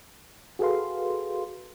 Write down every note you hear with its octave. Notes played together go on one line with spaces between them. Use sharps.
F#4 G#4 A4 B4 F5 C6